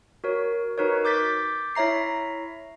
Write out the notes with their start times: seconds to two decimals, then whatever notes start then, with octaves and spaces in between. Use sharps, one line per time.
0.24 F#4 A#4 C#5
0.78 D#4 F#4 A#4 B4 C#5
1.05 D6 G6 A6 B6
1.75 E4 C#5 E5 A#5 C7